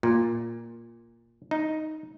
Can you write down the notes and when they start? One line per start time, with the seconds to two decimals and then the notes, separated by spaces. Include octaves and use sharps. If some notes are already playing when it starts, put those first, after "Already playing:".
0.03 A#2
1.51 D#4